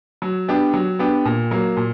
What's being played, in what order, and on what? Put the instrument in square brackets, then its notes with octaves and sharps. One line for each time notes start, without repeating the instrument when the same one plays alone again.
[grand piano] F#3
B3 D4 G4
F#3
B3 D4 G4
A#2
F#3 A#3
A#2